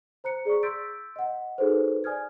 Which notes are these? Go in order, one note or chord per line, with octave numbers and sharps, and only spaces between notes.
C5 A#5 F#6 C#7
G#4 D5 A#5 C#6
C6 E6 G6 A6 B6 D7
D#5 F#5
D#4 F#4 G#4 A4 B4 C5
D5 G#5 D#6 F6 G#6